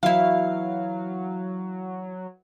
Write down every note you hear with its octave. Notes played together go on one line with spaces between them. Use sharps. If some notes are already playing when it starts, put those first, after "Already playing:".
E3 F#3 E4 F5